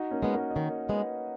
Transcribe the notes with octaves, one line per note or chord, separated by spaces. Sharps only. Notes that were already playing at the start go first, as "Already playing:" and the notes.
Already playing: D#4 F#4
A#3 C#4
G#3 B3
F#4 A#4
D#5
D#3 A#4 C#5
G#3 B3 B4 D#5